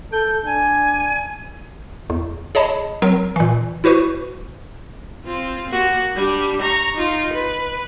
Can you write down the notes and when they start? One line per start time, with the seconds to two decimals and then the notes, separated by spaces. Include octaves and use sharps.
0.12 A4 G6
0.45 D4 G#5
2.10 E2
2.55 G#4 C#5 D#5 A5 B5
3.02 F#3 C4 A#4
3.36 A#2 E3
3.84 E4 F#4 B4 C5 C#6
5.24 C4 F4
5.70 A#3 F#4
6.15 G3 D4
6.62 A#5 C#6
6.96 D#4 F4
7.33 B4